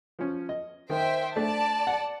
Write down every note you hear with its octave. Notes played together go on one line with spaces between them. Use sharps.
F3 C#4
D#5
D#3 C5 E5 G5
A3 D4 D5 A5
F#5